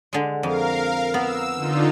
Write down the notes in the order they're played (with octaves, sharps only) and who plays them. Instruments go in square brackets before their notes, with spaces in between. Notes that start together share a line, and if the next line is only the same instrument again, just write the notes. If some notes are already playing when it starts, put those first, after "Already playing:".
[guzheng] D3 G#3
[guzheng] F2 [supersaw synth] A#4 F5
[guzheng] B3 [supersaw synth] E6
[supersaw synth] D3 D#4 F4